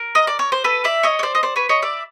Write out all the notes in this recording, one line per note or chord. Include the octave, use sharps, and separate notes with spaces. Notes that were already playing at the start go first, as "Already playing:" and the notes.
Already playing: A#4
D#5
D5
C#5
C5
A4 B4
D5 E5
C#5 D#5
C#5
C5 D5
D#5
C5 D5
B4 C#5
C#5 D#5
D5 E5